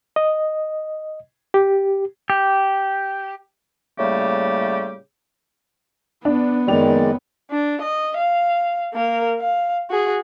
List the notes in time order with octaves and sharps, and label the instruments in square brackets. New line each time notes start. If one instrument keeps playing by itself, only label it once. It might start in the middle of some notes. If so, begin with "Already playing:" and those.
[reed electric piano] D#5
G4
[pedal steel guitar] G4
[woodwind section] A2 C#3 G3 A3 A#3 G4
[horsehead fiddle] B3 [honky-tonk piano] D4
[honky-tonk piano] F#1 G5 F7 [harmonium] D#3 G#3 D5
[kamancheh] D4
D#5
F5
A#3 A#4
F5
F#4 G#4